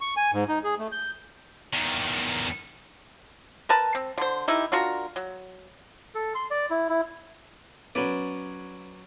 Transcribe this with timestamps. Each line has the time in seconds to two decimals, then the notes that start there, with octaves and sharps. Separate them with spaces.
0.01 C#6
0.17 G#5
0.33 G#2
0.48 D#4
0.64 G#4
0.79 A3
0.92 G6
1.73 E2 D#3
3.69 A#4 B4 A5
3.95 C4
4.18 D3 C5
4.48 D#3 D#4 E4 G4
4.72 D4 F4 F#4 A#4
5.16 F#3
6.15 A4
6.35 C6
6.51 D5
6.70 E4
6.89 E4
7.95 F#3 B3 C#4 B4 D5